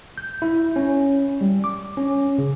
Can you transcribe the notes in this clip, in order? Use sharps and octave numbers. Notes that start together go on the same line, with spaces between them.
G6
E4
C#4
G3
D6
C#4
C#3